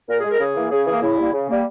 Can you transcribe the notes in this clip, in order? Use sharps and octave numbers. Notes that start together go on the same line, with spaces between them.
A#2 A#4
G#4
G#3
A#4
C#3 G#4
E3 A#3
C#3 G#4
E3 A#3 G#4
C#3 E4
G3 A#3
C#3
G3 A#3